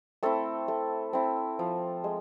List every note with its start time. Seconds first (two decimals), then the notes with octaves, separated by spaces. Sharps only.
0.23 A3 C4 E4 A4
0.68 A3
1.13 C4 E4
1.59 F3
2.04 G#3